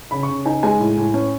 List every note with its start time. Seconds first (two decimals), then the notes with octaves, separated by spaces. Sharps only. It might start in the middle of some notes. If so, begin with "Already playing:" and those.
0.11 C#3 B5
0.23 C#6
0.28 C#3
0.46 D#4 G#5
0.63 G#3 G#5
0.80 A2
0.97 A2
1.14 C#4